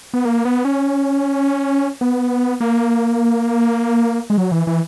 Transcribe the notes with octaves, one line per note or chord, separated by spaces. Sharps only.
B3
A#3
B3
C#4
B3
A#3
G#3
F#3
E3
E3